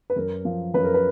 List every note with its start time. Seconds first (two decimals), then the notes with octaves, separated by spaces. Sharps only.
0.10 B4
0.16 F#2 A#4
0.45 F3
0.74 F#2 B4
0.84 A#4
0.94 B4